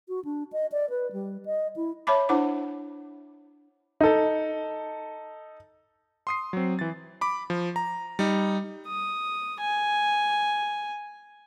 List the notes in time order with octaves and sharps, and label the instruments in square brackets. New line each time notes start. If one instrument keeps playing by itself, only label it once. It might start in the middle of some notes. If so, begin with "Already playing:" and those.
[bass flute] F#4
D4
D#5
D5
B4
G3
D#5
E4
[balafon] C#5 E5 A5 B5 D6
D4 E4 C5 F#5 D6
[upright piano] D#4 A4
[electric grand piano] C6 D#6 C7
F#3 C4
E3 A6
B5 D6
F3
A#5
G3 D#4
[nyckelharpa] D#6
G#5